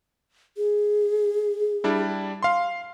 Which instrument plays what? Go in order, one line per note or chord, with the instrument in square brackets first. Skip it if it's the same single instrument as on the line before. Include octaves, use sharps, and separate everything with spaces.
[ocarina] G#4
[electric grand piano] G3 D4 E4
F5 C6